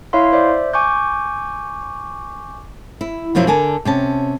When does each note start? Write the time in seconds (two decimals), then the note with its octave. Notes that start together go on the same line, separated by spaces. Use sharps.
0.13 E4 C#5 E5 F5 C6
0.33 C5 D5 E5
0.73 G#5 C#6 D6 G6
3.01 E4
3.35 F#2 B2 F3 F#3 E4
3.47 D3 A#4 G#5 A5
3.85 C3 C#4 A5